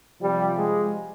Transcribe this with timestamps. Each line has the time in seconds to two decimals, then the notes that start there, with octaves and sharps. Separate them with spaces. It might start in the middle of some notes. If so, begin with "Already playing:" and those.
0.21 C3 F3 G3
0.57 G#3